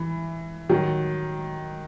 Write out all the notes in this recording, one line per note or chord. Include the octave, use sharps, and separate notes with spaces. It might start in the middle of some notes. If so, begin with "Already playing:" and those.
Already playing: E3
D#3 F#3